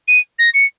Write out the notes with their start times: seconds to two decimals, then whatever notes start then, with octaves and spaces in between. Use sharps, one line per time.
0.07 D#7
0.38 A#6
0.54 C#7